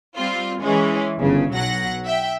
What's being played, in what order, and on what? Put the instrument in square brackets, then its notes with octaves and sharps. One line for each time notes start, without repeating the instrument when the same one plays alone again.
[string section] G3 C4 F4
E3 G#3 C#4
G1 C#3
B1 F#3 F#5 A#6
E5 G5